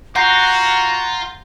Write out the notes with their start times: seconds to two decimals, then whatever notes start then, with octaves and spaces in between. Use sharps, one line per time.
0.16 F4 F#4 F#5 A#5 G6 C7